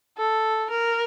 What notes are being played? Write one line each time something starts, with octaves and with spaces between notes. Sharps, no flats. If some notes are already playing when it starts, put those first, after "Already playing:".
A4
A#4